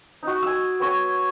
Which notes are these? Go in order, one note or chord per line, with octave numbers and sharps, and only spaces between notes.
D#4 F#4
G#5 E6
B3 C#5 G#5